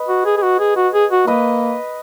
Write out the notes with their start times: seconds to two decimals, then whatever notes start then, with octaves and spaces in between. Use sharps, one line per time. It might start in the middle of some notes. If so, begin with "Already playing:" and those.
Already playing: B4 D#5
0.09 F#4
0.25 G#4
0.37 G#4
0.42 F#4
0.59 G#4
0.76 F#4
0.94 G#4
1.11 F#4
1.27 A#3 B4 D#5